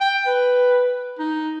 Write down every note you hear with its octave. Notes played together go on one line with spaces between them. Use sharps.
G5
B4
D#4